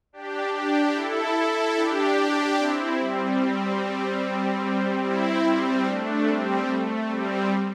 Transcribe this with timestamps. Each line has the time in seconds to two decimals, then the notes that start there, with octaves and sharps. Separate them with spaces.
0.13 D4 G4
0.53 D4 G4
0.94 E4 A4
1.76 D4 G4
2.58 C4 E4
2.99 G3 C4
5.04 C4 E4
5.45 G3 C4
5.87 A3 D4
6.27 G3 C4
6.68 A3
7.09 G3 C4